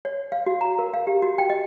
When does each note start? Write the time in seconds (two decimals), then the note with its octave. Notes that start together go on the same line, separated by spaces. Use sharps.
0.05 C#5
0.32 F5
0.46 F#4
0.61 A#5
0.79 A#4
0.94 F5
1.07 G4
1.22 F#4
1.38 G5
1.50 D#5